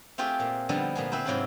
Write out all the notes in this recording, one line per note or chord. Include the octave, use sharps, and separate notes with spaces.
A3 C4 F4 G4 G#4
A#2
D3 F3 G3 B3 D#4
A#2 B3 G#4
C4 E4 B4 C5
G#2 C3 F#3 E4 F4 B5